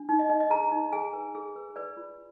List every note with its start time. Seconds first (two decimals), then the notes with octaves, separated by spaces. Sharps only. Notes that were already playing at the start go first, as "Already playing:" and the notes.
Already playing: D4
0.09 D#4
0.19 D#5
0.29 D#4 D#5
0.40 D#5
0.50 G#4 A#5
0.71 D#4
0.92 G#4 G#5
1.13 B4
1.35 G#4
1.56 B4
1.76 B4 D5
1.97 F4